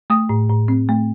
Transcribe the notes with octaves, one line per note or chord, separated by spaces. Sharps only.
A3 D#6
A2
A2
C4
A3